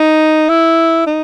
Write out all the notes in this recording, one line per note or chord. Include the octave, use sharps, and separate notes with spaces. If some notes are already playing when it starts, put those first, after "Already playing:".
Already playing: D#4
E4
D#4